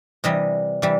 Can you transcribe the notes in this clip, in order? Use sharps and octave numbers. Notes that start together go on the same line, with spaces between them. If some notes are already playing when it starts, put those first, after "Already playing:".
C3 E3 G3 D#5
C3 E3 G3